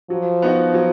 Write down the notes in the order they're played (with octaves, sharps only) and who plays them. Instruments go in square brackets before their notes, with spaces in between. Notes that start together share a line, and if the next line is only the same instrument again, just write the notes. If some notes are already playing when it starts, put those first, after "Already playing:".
[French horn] F3 [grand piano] F#3
[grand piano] B3 D#4 F#4
F#3